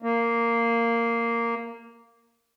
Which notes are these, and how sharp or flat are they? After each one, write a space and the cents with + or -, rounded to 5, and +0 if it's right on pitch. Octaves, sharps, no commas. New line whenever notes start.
A#3 -10